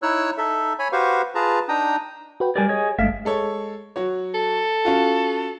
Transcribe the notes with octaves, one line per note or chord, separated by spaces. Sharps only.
D#4 E4 C#5 E6 F#6
D#4 A4 E5
C#5 G#5 B5
F#4 G4 B4 C5 F5 C#6
F4 G#4 B4 A5 A#5
D4 D#4 G5 A#5 D#6
F#4 B4 G5
G3 G4 A#4 D5 G#5
G#4 C#5 D#5
G1 G#3 A3 D4 E5 F5
G#3 A4 C#5
F#3 F#4 C#5
A4
C#4 F4 F#4